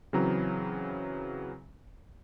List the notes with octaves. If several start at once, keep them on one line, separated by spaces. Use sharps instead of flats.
C#3 E3 F#3 C4 A#5